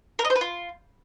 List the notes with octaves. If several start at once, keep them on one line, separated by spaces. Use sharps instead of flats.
A#4
D#5
C5
B4
F4